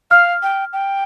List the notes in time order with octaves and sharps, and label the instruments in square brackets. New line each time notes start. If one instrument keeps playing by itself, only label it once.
[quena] F5 [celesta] F6
[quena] G5
G5